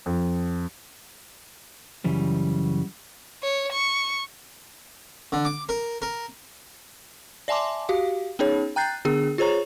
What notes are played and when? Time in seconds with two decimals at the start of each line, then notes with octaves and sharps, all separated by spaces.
0.06 F2
2.04 F#2 C#3 E3 G3
3.43 C#5
3.72 C#6
5.32 D3
5.45 D6
5.69 A#4
6.02 A#4
7.48 D5 E5 G#5 A5 C6 D6
7.89 F#4 G4 F5
8.39 B3 C#4 D#4 G#4 C#5
8.76 G5 A#5 F#6 G6 A6 C7
9.05 D3 B3 D4 G#4
9.38 F4 G#4 C5 C#5 A#5 C#6